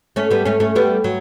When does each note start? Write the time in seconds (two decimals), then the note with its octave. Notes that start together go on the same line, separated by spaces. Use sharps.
0.16 A3 C#4
0.31 G3 B3
0.45 A3 C#4
0.60 A3 C#4
0.76 G3 B3
1.04 F#3